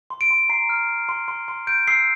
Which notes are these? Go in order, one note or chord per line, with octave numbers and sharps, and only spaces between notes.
C6
D7
C6
A#5 C7
F6
F6
C6
C6
C6
G6 D7
E6 C7